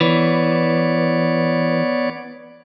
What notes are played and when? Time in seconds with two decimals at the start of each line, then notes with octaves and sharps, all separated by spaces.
0.01 E3 B3 C#5 D5